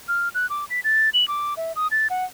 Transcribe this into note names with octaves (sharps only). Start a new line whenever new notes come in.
F6
F#6
D6
B6
A6
F#7
D6
E5
D#6
A6
F#5